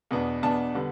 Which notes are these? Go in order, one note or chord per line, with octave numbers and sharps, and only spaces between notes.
E2 B2 B3 D4
E2 B2 B3 D4 A5
D3 G3 B3